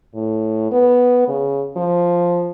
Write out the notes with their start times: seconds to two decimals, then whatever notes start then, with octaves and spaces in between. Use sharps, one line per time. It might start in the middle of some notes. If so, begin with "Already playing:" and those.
0.15 A2
0.71 B3
1.28 C#3
1.76 F3